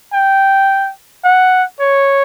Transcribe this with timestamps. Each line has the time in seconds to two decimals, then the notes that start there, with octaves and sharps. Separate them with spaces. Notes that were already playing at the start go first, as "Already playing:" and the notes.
0.13 G5
1.24 F#5
1.80 C#5